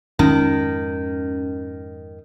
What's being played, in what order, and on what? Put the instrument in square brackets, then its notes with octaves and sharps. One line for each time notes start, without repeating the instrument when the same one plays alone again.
[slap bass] F2 G#2 G#3 [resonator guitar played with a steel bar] D#3 [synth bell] C#4